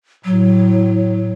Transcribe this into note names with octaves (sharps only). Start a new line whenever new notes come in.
A2 F#3